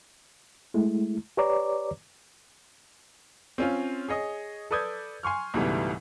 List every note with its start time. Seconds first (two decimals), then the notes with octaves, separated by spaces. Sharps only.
0.74 G#3 A3 E4
1.37 G4 B4 C#5 D5 A#5 D6
3.58 C4 C#4 F4
4.08 G#4 C#5 D#5 D#6
4.71 A4 B4 D5 D#6 G6 G#6
5.23 G#5 C6 C#6 F6
5.54 C#2 G#2 B2 E3 G3 A3